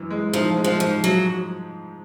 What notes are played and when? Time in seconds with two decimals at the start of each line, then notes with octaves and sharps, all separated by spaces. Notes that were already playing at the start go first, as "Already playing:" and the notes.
Already playing: F#2 E3
0.10 G#3
0.33 F3 D#4
0.57 G#3
0.64 F3
0.80 G#2 F3
1.03 F3 F#3